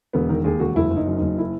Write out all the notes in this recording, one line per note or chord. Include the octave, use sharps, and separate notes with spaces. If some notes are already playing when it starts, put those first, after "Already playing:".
E1 B3
D#3 A#4
D#2 G#4
E1 F#4
F#1 E4
F#1
D#4
F#2
F#1 D#4
E4